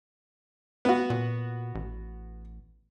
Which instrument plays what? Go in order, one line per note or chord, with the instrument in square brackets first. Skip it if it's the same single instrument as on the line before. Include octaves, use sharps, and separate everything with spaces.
[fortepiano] B3 F#4
[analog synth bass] A#2
A1